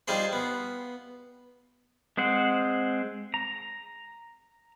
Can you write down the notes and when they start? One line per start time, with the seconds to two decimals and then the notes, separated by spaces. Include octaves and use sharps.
0.08 G3 D#4 F4 G#4 C5
0.33 B3
2.17 G#3 C4 C5 F#5
3.34 A#5